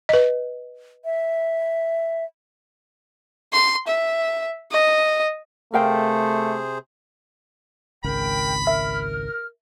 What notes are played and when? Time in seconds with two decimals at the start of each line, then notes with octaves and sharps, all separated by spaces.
0.09 B4 D#5
1.05 E5
3.52 C6
3.87 E5
4.72 D#5
5.74 C3 A3 G#4 A#4 C5 F5 G5
8.04 G#1 C#2 C#3 A#4 G5 B5
8.67 A#4 E5 F6